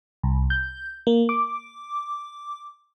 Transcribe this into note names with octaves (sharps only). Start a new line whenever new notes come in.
C2
G6
A#3
D6